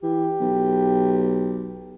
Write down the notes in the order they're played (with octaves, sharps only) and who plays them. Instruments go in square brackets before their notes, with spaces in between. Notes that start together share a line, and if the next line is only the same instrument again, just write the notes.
[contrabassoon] E3 [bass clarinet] G4
[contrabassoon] B1